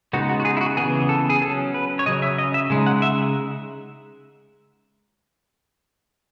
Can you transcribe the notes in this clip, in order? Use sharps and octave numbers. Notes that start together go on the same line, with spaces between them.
C#3 G#3 B3 D#4 F#4
F#4
F#4
G#4
E4
F#4
C#3 E3 B3 G#4
A4
G#4
F#3 C#4 A4
B4
C#5
C#3 F#3 C#4 D#5
E5
D#5
E5
C#3 G#3 D#4
F#5
E5